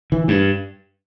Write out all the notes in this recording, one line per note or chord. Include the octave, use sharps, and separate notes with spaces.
E3
G2